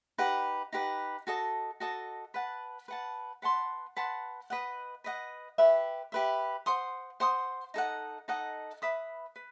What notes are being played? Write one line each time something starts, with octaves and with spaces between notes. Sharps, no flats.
D#4 G4 B4 F#5
D#4 G4 B4 F#5
F#4 A4 D#5 A5
F#4 A4 D#5 A5
B4 F#5 A5
B4 F#5 A5
B4 F#5 A5 C6
B4 F#5 A5 C6
B4 D#5 F#5
B4 D#5 F#5
G4 B4 E5
G4 B4 E5
C5 F#5 C6 D#6
C5 F#5 C6 D#6
D#4 A4 D#5 F#5
D#4 A4 D#5 F#5
B4 E5 B5 D#6
B4